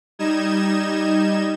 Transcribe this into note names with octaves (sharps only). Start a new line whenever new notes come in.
G3 D#4 D#5 G#6 E7